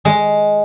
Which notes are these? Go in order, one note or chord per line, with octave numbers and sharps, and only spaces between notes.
G#3